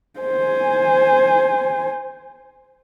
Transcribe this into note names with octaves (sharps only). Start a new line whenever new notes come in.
C5 G#5